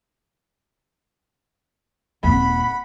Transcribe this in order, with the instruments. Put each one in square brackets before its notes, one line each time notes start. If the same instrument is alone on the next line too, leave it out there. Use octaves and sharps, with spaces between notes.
[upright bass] D#1 C4 [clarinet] F#5 [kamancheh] B5